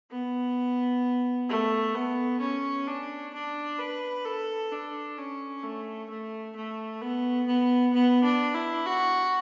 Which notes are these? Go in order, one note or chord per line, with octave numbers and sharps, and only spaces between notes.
B3
A3
B3
C#4
D4
D4
B4
A4
D4
C#4
A3
A3
A3
B3
B3
B3
D4
E4
F#4